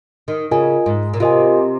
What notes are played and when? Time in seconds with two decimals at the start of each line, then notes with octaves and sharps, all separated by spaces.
0.28 D#3
0.51 C#3 F4 A#4 D#5 G#5
0.86 G#2
1.14 A#2
1.20 C3 F4 A#4 D#5 G#5